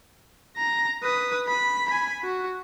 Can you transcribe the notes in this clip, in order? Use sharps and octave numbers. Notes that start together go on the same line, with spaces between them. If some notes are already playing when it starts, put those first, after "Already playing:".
A#5 A#6
B4 D#6
B5
G#5 B5
F#4